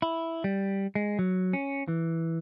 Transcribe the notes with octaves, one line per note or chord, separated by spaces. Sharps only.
E4
G3
G#3
F#3
C#4
E3